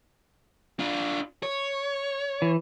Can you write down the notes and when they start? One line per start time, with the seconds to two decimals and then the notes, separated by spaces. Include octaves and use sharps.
0.79 D4 F4
1.43 C#5
2.42 E3